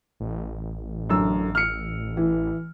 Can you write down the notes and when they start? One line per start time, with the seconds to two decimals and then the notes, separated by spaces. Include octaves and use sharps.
0.20 A1
1.10 F#2 D3 E6
1.55 F6 C#7
2.17 E3